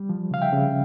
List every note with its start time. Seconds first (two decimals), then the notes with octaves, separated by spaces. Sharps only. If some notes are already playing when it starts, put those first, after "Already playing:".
Already playing: G3
0.09 F3
0.31 C#3 F5
0.42 E5 G5
0.52 C#3